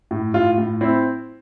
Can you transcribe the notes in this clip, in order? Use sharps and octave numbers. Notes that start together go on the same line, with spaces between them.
A2
A2 F4
A2
C4 E4